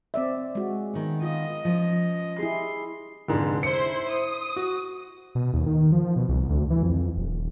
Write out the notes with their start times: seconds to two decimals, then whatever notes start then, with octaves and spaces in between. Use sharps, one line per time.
0.14 C4 D5 E5
0.55 G#3 F#4
0.93 D#3 B3
1.22 F4 D#5
1.65 F3 C#4
2.39 E4 G4 G#4 C6
3.28 F1 G#2 D3
3.63 E4 C5 C6 C#7
4.11 D#6
4.56 F#4
5.35 B2
5.54 D#2
5.66 D#3
5.92 F3
6.16 B2
6.29 C2
6.49 D2
6.70 E3
6.83 F2
6.94 F2
7.17 D#1